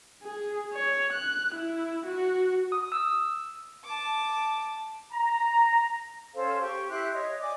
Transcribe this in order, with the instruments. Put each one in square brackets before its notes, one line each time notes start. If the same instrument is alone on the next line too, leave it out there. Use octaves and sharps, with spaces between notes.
[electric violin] G#4
C#5
F#6
E4
F#4
[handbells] D#6
E6
[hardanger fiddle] A5 D6
[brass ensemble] A#5
[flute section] C#4 A4 C5 F5
G4 C#6
E4 G4 C6 F#6
C#5 D#5
D5 G#5 D6